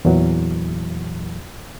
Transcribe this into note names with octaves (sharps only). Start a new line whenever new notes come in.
E2 A#2 E3 F#3